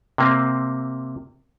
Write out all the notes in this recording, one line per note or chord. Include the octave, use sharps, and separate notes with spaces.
C3 A#3 C4